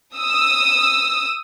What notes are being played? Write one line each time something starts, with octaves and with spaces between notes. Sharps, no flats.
D#6 E6